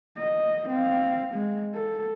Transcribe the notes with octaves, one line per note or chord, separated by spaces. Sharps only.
D#5
C4 F5
G#3
A4